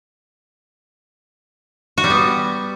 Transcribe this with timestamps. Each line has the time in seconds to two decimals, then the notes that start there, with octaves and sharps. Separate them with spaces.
1.98 F#4
2.04 G3
2.10 B3